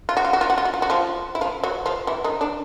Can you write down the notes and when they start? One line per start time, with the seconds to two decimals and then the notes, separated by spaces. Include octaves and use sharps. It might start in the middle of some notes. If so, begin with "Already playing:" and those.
0.09 F4
0.17 F#4
0.25 F4
0.33 F#4
0.41 F4
0.50 F#4
0.58 F4
0.65 F#4
0.74 F4
0.82 F#4
0.90 F3 F4
1.35 E4
1.41 F3 F4
1.63 F#3 F#4
1.86 F3 F4
2.07 E3 E4
2.24 D#3 D#4
2.41 D3 D4